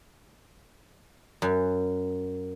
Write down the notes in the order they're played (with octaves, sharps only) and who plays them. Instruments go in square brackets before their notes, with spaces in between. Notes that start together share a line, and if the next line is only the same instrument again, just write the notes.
[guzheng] F#2